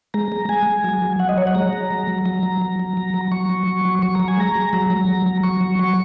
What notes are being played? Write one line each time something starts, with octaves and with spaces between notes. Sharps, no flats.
G#3 A#5
G#3
G#3 G#5
G#3
F#3
F#3
F#3 F#5
D#5
F#3 C#5
F#5
G#3 A#5
G#3
F#3
F#3
F#3 A#5
F#3
F#3
F#3
F#3
F#3
F#3 C#6
F#3
F#3
F#3
F#3 C#6
F#3 A#5
G#5
G#3 A#5
G#3
F#3 A#5
F#3
F#3
F#3
F#3 C#6
F#3
F#3